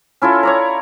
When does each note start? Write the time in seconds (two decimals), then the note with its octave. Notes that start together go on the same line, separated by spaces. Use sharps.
0.22 C#4 E4 F4 A4
0.43 C#5 D5 A#5